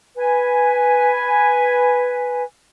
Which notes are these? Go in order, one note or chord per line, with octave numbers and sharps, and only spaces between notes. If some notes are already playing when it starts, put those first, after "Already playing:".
B4 G#5